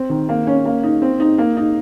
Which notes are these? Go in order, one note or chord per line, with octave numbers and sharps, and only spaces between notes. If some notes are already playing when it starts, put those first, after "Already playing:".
Already playing: C4
D#3
A#3
C#4
A#3
D#4
C4
D#4
A#3
D#4